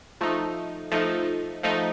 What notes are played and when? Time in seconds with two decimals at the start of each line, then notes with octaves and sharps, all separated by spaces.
0.21 F3 A3 D#4
0.92 F3 A3 D#4
1.63 F3 A3 D#4